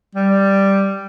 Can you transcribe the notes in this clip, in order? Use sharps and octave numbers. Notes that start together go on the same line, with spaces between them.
G3